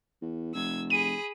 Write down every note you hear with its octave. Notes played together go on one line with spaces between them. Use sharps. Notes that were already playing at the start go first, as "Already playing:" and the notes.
E2
F1 E6 G#6
G#4 B5 D#7